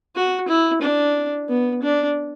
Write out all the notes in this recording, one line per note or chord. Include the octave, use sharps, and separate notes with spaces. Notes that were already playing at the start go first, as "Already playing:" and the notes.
F#4
E4
D4
B3
D4